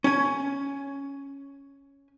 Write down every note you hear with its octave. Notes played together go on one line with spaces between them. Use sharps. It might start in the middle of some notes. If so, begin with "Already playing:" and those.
C#4 G#5